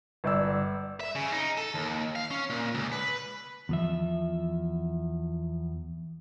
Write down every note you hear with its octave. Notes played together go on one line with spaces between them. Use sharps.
G1 D5 E6
E5
C#3
D#4
A4
D#2
F5
C#4
A#2
C#2
B4
E2 F3 E5